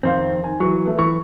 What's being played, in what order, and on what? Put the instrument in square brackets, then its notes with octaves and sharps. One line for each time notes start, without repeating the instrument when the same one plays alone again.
[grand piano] F2 C5 F5 [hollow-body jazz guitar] C3 D#3 C4
[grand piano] D#3 G#5
[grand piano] E3 C#6 [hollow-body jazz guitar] F#3
[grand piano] A3 B3
[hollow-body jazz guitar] E3 [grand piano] C#6